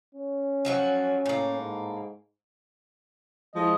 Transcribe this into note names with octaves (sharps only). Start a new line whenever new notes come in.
C#4
F3 F#3 F#4
A2 A#3
G#2
F3 G#3 E4 D#5